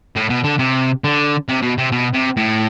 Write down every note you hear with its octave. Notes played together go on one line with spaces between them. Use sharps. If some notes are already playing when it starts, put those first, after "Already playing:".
A2
B2
D3
C3
D3
C3
B2
C3
B2
C3
A2